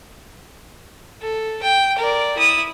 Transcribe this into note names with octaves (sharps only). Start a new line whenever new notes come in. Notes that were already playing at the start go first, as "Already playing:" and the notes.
A4
G5
A#4 D5
E4 D#6